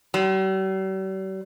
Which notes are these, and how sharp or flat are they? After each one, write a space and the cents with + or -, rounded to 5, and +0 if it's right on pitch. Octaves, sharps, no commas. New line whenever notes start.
G3 -45